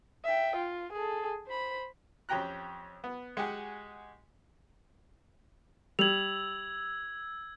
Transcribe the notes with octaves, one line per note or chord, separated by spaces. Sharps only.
E5 G5
F4
G#4 A4
C5 B5
F2 C#4 G4 G5 A#5 F#6
B3
G#3 F#4 G4 F#5 G#5
G3 E6 G#6 F7 F#7